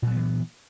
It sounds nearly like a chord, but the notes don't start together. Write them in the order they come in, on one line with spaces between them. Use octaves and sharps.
A#2 F#3 B3 E3